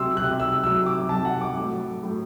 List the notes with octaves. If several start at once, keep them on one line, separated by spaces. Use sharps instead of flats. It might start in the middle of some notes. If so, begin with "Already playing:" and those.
Already playing: C3 F#3 C6 E6
C3 F#3 F#6
E6
C3 F#3 E6
D6
C3 F#3 A5
F#5
D6
A2 F#3
A2 F#3